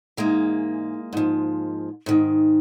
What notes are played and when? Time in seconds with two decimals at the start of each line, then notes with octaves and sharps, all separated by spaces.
0.17 G#2 E3 G#3 A#3
1.13 G#2 F3
2.06 G#2 D#3